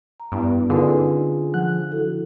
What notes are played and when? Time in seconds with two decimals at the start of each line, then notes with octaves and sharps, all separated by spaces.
0.20 A#5
0.32 G2 B3 E4
0.70 D3 C#4 D#4 F4 G#4 A#4 B4
1.54 F3 F#5 F#6
1.92 E4 F#4 A4